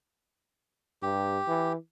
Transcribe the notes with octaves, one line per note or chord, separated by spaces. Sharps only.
G2 G4
E3